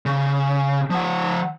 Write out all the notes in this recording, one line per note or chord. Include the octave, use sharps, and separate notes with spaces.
C#3
F3 F#5